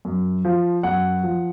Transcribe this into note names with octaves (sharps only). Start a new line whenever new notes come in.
F#2
F3
F#2 F#5
F3